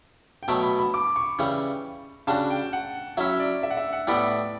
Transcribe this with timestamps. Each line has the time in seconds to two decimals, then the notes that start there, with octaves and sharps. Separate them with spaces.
0.43 G5
0.48 B2 F#3 A3 A5
0.63 B5
0.79 B5
0.94 D6
1.16 C#6
1.39 C#3 E3 G3
2.27 C#3 G3 D4 F#4 A5
2.50 G5
2.73 F#5
3.17 F#3 C#4 E4 E5
3.40 D5
3.63 E5
3.70 F#5
3.77 E5
3.93 F#5
4.07 A2 G3 B3 E4 D5